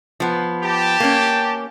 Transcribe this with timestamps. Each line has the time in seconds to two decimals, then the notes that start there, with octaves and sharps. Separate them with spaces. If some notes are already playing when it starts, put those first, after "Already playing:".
0.20 F3 B3
0.63 G4 A5
1.00 A#3 C#4